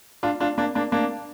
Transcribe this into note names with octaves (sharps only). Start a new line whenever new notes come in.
D4 F4
D4 F4
A#3 D4
A#3 D4
A#3 D4